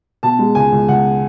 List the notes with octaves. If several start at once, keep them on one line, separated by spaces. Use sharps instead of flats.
B2 A5
G#3
C#2 G#5
C#2
C#2 F#5